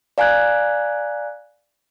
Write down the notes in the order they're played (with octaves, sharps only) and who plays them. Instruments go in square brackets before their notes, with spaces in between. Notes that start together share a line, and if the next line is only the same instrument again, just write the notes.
[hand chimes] D5 F5 G#5 A#5 F#6 G#6